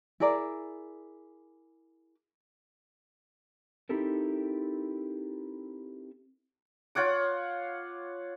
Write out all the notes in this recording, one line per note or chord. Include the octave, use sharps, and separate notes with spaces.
E4 G#4 A#4 D5
C4 D#4 E4 G4 A4 A#4
F4 C#5 F#5 D6